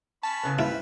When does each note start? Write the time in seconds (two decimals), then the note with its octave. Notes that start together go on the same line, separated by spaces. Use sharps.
0.23 C#4 A5 B5
0.43 A2 C#3 B3
0.59 C4 E4 B4 F5